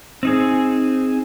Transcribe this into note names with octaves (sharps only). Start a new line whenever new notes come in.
C4 D#4 G#4